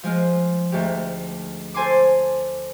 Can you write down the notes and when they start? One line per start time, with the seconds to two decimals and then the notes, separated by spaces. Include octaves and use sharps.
0.03 F3 G#3 F4
0.72 D2 G#2 G4
1.74 A4 C5 G#5 C6 D6